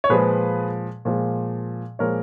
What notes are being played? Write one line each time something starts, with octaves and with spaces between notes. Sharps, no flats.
C#5
A#2 F3 G#3 G#4 B4
A#2 F3 G#3
A#2 F3 G#3 A#4 C#5